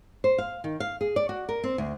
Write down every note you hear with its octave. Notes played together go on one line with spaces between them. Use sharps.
C5
F5
D#3
F5
G#4
D5
F#4
A#4
C4
D2